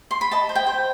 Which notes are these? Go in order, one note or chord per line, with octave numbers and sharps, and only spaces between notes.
C6
B5
D#5 A5
C5
G5
C5